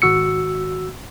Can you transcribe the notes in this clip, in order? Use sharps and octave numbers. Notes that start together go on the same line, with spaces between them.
G#1 F#4 E6 C#7